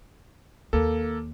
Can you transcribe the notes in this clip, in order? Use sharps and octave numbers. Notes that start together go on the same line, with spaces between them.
D#2 A#3 A4